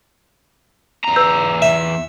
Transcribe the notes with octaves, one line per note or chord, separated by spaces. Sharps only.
E2 A#5
B4 E6 G6
E5